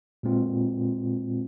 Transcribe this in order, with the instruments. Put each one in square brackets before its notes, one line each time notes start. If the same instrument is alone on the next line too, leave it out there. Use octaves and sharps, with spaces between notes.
[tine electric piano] A#2 G#3 C4 F4